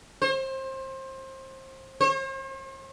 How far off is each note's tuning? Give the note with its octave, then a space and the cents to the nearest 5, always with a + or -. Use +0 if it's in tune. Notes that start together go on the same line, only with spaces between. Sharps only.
C5 +25
C5 +45